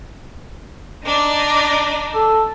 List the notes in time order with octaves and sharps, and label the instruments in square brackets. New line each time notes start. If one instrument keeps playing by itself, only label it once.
[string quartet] D4 D#4
[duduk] A4